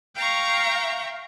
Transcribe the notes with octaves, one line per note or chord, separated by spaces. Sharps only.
F5 G5 A#5 C#6